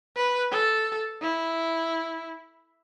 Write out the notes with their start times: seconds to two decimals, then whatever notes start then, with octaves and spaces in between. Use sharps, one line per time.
0.16 B4
0.52 A4
1.22 E4